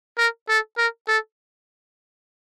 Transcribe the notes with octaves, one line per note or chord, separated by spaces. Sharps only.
A#4
A4
A#4
A4